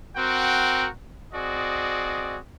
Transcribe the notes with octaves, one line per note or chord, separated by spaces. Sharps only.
C4 F#4 A#4 F#5 G5
C4 F#4 G#4 D5 D#5